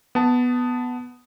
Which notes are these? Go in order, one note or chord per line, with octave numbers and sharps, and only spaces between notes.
B3 A5